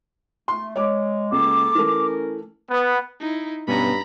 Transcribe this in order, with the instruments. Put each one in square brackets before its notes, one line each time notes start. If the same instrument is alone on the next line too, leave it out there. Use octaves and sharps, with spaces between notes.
[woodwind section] A3 [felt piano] C6
[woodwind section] G#3 [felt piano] C#5 D6
[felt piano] C#2 [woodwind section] A#3 A4 [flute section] D6
[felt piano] E3 A3 [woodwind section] C#4 A#4
[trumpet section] B3
[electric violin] D#4 E4
[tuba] G2 [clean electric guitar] B2 B3 C#4 [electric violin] A#5 B5